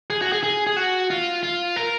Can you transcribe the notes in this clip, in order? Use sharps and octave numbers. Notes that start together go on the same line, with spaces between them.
G#4
F#4
G#4
G#4
G#4
F#4
F4
F4
A#4